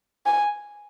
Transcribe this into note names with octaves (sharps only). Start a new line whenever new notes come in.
G#5